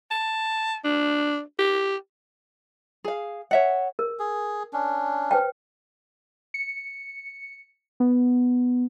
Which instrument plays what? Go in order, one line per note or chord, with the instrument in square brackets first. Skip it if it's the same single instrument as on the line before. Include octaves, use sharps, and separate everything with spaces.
[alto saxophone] A5
D4
G4
[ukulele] G#4 F5
C#5 E5 F#5
[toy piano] A#4
[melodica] G#4
C#4 D4
[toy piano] B4 C5 G5
[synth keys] C#7
B3